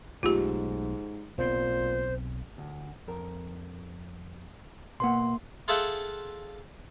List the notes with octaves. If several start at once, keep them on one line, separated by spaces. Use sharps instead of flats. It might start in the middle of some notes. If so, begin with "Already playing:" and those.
B1 G#2 A3 F4 G4
B1 A#2 B3 C4 C5
D2
F2 A#4
B2 A#3 B4 F#5 C6
F4 G#4 A4 E5 F#5 G5